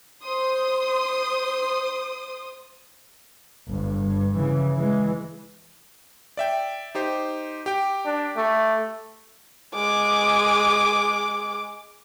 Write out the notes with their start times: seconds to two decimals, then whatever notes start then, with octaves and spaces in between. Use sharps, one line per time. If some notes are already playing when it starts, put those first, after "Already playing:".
0.23 C5 C6 D#6
3.68 G1 G2
4.04 G2
4.36 C#3 E3
4.74 E3 G#3
6.37 D5 E5 G5
6.95 D#4 G4 C5
7.66 G4 G5
8.06 D4
8.37 A3
9.74 G#3 D6